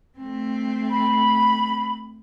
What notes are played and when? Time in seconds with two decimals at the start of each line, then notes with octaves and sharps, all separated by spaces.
0.18 A3 C4
0.90 B5